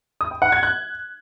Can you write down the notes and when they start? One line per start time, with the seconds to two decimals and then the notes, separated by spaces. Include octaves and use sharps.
0.21 D#6
0.31 G5
0.42 F#5
0.52 G#6
0.63 F#6